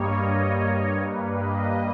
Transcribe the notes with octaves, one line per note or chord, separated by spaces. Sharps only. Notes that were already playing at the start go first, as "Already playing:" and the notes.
Already playing: G2 G3 A#3 C#5 D#5
C#5
C#5
G2 G3 A#3 B4
D#5